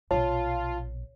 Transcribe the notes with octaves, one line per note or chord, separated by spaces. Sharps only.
A#1 B2 F4 C#5 A5